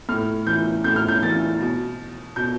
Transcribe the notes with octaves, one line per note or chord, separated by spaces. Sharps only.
A2 F6
E3 G6
A2 G6
F6
G6
E3 A6
B2
B2 G6